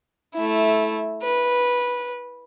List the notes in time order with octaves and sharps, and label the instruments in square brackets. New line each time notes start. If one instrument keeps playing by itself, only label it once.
[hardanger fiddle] A3 E4
B4